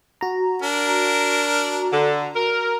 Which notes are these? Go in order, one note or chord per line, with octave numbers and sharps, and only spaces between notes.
F#4 A#5
D4 A#4
D3
A#4